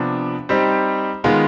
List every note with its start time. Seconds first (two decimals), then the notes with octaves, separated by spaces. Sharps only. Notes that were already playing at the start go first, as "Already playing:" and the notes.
Already playing: C3 F3 B3 D4
0.49 G3 C4 D#4 G4
1.24 D#3 G#3 B3 F4